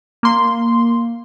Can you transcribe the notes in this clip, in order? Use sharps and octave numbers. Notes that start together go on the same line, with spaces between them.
A#3 C6